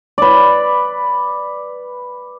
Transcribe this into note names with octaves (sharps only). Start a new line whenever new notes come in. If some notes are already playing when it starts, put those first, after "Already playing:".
B4 D5